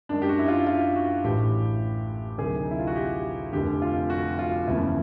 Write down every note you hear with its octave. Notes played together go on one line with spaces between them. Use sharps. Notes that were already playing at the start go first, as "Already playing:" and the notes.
F#2 D#3 G#3 D4
G4
F#4
E4
F4
F4
F#4
A1 A2 E3 A3 G4
D2 C3 D#3 F#3 G#4
D#4
E4
F4
F#4
G4
F1 F2 D3 G4
F4
F#4
F4
F#1 E2 C#3 F3 A3 E4